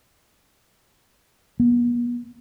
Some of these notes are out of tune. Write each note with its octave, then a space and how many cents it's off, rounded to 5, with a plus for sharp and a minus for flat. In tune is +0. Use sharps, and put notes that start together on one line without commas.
B3 -45